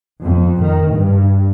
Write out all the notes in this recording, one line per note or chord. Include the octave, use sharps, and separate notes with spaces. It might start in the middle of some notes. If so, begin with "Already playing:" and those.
F2
D#3
G2